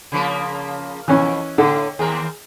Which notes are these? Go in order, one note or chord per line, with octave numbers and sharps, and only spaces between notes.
C#3 F3 A#3
F2 E3 C#4
A2 D3
D#2 C4 G#4 A#4